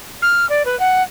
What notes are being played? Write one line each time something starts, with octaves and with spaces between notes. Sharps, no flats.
F6
D5
B4
F#5